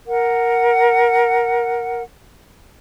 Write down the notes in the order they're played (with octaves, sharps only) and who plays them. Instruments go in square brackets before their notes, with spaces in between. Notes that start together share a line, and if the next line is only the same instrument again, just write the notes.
[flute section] A#4 F#5